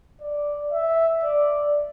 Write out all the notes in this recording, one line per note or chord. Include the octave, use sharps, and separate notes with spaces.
D5
E5
D5